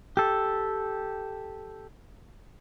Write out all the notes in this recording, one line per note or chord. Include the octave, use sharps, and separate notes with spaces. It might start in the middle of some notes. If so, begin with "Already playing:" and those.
G4 A4